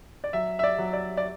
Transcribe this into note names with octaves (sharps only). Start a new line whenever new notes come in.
D5
F#3 E5
E5
D5
F#3
D5
D5